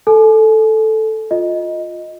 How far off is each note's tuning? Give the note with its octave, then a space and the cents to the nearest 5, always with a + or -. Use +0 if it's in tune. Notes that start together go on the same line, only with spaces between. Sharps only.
A4 +0 G#5 +40
F4 +15 D#5 +0